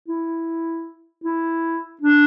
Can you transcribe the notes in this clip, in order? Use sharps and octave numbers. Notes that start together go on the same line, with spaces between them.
E4
E4
D4